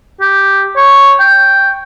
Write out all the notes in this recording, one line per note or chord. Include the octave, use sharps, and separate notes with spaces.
G4
C#5
G5